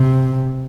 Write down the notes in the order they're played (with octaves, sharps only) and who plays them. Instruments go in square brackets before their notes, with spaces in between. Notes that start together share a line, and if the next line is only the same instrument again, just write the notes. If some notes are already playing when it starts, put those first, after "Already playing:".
Already playing: [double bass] C3